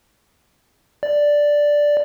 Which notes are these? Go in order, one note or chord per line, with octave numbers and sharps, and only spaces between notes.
D5